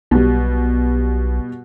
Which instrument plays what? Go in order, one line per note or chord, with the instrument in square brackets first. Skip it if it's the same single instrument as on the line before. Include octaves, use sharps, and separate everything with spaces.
[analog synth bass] B1 [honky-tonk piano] B2 G3